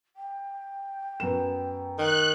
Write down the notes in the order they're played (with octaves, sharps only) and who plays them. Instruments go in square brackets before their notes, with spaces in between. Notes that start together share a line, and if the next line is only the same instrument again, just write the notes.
[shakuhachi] G5
[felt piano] F#2 B3 E7
[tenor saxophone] D#3 [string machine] F#6